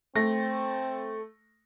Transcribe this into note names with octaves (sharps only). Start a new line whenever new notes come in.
A3 C4 A#6